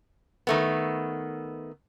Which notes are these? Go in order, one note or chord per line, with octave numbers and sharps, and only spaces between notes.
D#3 A3 B3